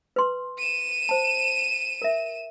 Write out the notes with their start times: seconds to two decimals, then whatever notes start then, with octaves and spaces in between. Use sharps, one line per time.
0.16 B4 C6
0.58 D#7 E7
1.09 C5 A5
2.02 A#4 E5